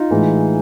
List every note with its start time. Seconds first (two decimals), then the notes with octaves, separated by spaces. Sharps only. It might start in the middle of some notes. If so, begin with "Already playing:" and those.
Already playing: D#4 F4
0.11 A2 E3 G#3